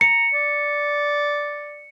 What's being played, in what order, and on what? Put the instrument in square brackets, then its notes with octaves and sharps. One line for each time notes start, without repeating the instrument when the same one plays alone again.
[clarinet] A#5 [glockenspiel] C#7
[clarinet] D5